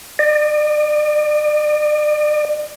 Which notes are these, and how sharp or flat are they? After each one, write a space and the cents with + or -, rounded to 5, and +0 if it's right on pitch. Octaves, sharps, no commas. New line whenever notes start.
D5 +40